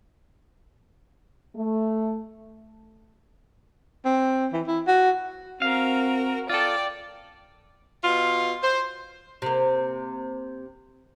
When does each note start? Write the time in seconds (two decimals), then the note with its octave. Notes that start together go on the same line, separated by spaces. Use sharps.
1.55 A3
4.05 C4
4.53 E3
4.67 E4
4.87 F#4
5.62 C4 F#4 A#4 F5
6.49 F4 A4 D5 G5
8.04 B2 F4
8.63 C5
9.42 C3 A#3